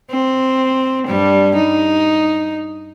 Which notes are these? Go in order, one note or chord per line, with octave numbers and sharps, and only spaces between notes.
C4
G2 G3
D#4